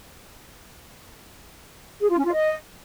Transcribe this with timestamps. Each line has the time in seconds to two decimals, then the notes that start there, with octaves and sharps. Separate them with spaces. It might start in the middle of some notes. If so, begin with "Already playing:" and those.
2.01 G#4
2.09 F4
2.17 C#4
2.25 F4
2.33 D#5